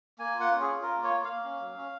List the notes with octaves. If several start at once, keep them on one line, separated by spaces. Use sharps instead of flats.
A#3 G#5
F4
F#5
C#4
G#4
F4
F4 A#4
A#3
C#5
A#3
A#3 F5
C#4
F#3
C#4